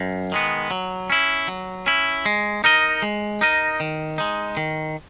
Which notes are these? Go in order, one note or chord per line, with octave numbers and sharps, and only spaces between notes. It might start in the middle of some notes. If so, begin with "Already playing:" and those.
Already playing: F#2
D#3 G#3 B3
F#3
C#4 E4
F#3
C#4 E4
G#3
D#4 A#4 D#5
G#3
D#4 A#4 D#5
D#3
G#3 D#4
D#3